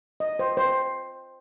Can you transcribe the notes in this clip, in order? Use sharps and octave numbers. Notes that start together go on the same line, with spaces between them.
D#5
C5
C5